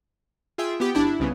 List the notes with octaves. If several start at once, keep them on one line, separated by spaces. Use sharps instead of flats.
F4 G#4 E5 G5
B3 G4
G1 D4 E4
E4
C2 C#3 B3